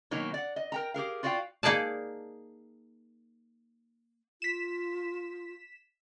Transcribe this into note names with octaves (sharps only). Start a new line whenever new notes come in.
B2 D#3 F#3 A#3 D#4 C#5
D5 F#5
D#5
A#4 G5 A#5
G4 G#4 A#4 F5
F4 F#4 D5 D#5 F5 G5
A#3 D#4 G#4 D5 A5
F4 B6 E7